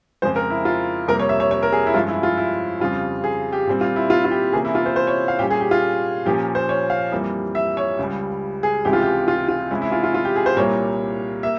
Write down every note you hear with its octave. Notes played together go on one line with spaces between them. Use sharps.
F2 C#3 F3 G#3 C5
A#4
E4
F4
F2 C3 G3 A#3 A#4
C#5
E5
C#5
C#5
A#4
G#4
E4
G2 F3 G#3 C#4 F4
E4
F4
E4
F2 C#3 G3 F4
G#4
G4
A#2 G3 C4
F4
E4
F4
F4
G4
C3 E3 A#3 C#4 G#4
E4
F4
C5
C5
C#5
F5
A#2 G3 C#4 G4
G#4
G4
F4
A#2 F3 A#3 C#4 G4
C5
C#5
F5
F2 E3 G3 A#3
E5
C#5
C#2 C#3 G3
G#4
C#2 C3 E3 G#3 G4
F4
G4
F4
F4
C3 E3 G#3 C#4 E4
E4
F4
F4
F4
G4
G#4
C5
C2 A#2 G3 A#3 C#5
A#3 E5